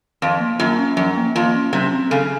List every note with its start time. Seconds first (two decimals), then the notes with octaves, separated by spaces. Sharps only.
0.22 F2 F3
0.40 A#3
0.59 F#2 F4
0.79 C#4
0.97 F#2 F3
1.17 A#3
1.35 F2 F4
1.55 C#4
1.73 C3 F#3
1.92 C4
2.10 C#3 A4